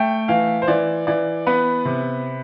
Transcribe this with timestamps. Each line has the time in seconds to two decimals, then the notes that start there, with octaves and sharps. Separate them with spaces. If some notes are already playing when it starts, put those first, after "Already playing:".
Already playing: A3 G5
0.28 E3 F5
0.62 C5
0.68 E3 D5
1.07 E3 D5
1.46 B3 B4
1.85 C3